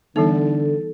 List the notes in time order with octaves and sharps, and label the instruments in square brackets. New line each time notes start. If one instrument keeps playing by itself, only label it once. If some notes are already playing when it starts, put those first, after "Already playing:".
[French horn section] D3 [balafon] E3 G3 B3 [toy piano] D#4 [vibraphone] A4